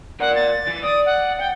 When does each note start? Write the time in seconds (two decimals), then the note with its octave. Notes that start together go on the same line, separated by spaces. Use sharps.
0.20 A#4 D5 F#5
0.35 A6
0.67 E3
0.83 D5 D#6
1.06 F#5
1.39 F#5 G5